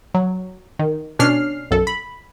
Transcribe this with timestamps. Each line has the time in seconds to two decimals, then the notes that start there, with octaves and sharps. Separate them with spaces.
0.14 F#3
0.79 D#3
1.19 B2 C#4 D4 F6 C7
1.71 B1 F#2 A4
1.87 B5